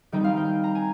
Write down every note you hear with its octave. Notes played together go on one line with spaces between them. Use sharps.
D#3 G3 C4 D#4 G5
F5
G5
A#5
G#5